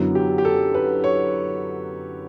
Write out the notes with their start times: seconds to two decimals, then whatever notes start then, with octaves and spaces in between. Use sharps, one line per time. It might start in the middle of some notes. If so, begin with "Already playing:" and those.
Already playing: F#2 D3 F#3 B3 E4
0.15 G4
0.38 G4
0.45 A4
0.74 B4
1.04 C#5